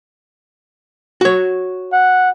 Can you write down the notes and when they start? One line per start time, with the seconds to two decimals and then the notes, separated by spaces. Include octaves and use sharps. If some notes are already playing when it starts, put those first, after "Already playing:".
1.21 F#4 C#5
1.93 F#5